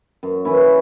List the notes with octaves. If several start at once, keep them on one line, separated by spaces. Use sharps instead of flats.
F#2
E3 C#4 E4